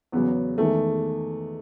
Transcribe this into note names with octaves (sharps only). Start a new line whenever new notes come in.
E2 C#3 F#3 B3
E2 D#3 G#3 A3